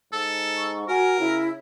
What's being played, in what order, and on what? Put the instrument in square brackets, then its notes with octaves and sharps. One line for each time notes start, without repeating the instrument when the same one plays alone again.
[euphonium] G#2 [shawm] A4
[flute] C#6
[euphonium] F#4 [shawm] A#4 [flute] G#5
[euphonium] C#3 [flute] E4